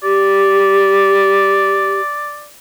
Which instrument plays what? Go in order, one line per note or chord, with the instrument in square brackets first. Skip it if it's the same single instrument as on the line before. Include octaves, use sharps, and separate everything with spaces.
[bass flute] G4 [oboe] D5